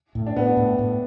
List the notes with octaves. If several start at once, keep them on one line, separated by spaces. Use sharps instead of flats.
A2
D4
A2 B3
D4
A2
A2